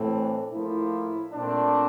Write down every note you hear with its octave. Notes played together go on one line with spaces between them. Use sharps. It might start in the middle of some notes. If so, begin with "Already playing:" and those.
Already playing: A2 E3 A3 C4
D4
A2 F3 A#3 E4
A#2 A3 C4 D4